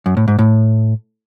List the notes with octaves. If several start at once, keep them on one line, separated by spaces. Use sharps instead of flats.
F#2
A2
G#2
A2